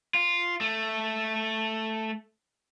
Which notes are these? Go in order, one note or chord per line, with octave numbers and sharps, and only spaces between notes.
F4
A3